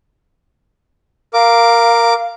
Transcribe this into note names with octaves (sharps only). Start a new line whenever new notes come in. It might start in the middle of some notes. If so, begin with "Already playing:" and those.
A#4 F5 D6